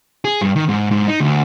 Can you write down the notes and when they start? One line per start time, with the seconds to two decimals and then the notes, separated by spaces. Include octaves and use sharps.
0.25 G#4
0.42 G2
0.56 D#3
0.69 G#2
0.91 G#2
1.08 D#4
1.20 D2